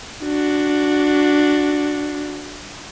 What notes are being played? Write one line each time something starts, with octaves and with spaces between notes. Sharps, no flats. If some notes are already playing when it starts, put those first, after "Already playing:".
D4 F#4